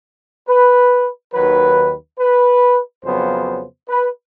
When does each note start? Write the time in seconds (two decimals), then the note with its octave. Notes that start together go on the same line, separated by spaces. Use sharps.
0.48 B4
1.34 D#2 D#3 F#3 B4
2.20 B4
3.05 F2 C#3 F#3 B3 C5
3.89 B4